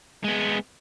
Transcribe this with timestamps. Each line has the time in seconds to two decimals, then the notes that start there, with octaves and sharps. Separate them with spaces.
0.24 G#3 B3